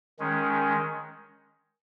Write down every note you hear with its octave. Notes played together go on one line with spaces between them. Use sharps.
D#3 G#3 C#4